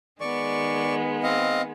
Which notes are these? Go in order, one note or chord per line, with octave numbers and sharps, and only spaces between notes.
D#3 G#3 B3 D5 C#6
C4 D#5 F5